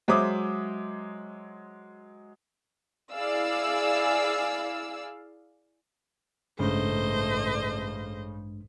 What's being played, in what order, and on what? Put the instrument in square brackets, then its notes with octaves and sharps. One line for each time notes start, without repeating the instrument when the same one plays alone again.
[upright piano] F#3 G#3 C5 E5 D6 D#6
[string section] E4 G#4 D5 F5 E6
[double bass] A1 A3 [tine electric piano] G2 G#3 D4 [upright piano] C#3 [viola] C5 D#5